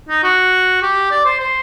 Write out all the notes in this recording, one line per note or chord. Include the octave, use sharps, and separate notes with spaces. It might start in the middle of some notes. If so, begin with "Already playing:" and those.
D#4
F#4
G4
D5
C5
C5